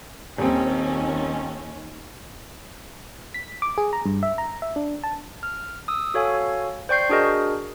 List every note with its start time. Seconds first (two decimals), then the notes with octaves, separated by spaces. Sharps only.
0.38 D#1 D#2 C4 C#4
3.34 B6
3.62 D6
3.78 G#4
3.93 A#5
4.06 G2
4.23 E5
4.38 A#5
4.62 E5
4.76 D4
5.04 A5
5.43 F6
5.88 D#6 E6
6.14 F#4 A4 C#5 F5 G#5
6.89 C5 D5 G5 C#6 G6 C7
7.09 D4 F#4 G#4 A#4 D#5